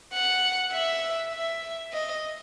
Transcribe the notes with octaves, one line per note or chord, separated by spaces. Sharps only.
F#5
E5
E5
D#5